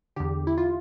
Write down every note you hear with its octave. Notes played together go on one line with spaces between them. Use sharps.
E2 D3 G4
E4
F4